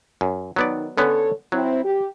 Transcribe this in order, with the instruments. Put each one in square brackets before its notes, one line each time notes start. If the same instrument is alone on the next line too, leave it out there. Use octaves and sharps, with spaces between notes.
[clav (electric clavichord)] F#2
[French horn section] D#3 [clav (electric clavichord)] F#3 B3 D5
[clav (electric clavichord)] D3 B3 C#4 [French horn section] A4 C#5
[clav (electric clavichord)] F#3 [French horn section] C4 E4
[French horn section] G4